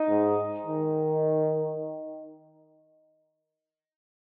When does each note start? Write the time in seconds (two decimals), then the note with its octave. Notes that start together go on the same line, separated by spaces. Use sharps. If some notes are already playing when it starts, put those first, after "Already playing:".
Already playing: D#4
0.09 G#2
0.67 D#3